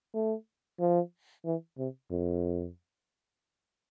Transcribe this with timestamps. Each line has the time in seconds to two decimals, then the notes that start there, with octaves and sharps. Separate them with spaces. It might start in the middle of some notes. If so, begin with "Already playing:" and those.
0.15 A3
0.80 F3
1.45 E3
1.78 C3
2.11 F2